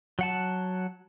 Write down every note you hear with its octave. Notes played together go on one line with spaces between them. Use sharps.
F#3 F#5 A5